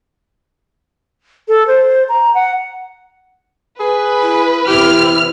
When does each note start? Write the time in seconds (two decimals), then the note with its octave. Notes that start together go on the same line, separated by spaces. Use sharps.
1.48 A4
1.67 C5
2.09 A#5
2.35 F#5
3.80 G#4 B4
4.22 E4
4.67 E2 C3 E4 G4 F6